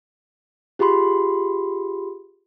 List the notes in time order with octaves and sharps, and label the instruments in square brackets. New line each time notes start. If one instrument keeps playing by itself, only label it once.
[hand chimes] F4 G4 G#4 B5 C6